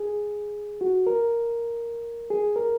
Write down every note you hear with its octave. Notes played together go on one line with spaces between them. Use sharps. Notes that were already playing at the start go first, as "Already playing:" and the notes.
Already playing: G#4
F#4
A#4
G#4
A#4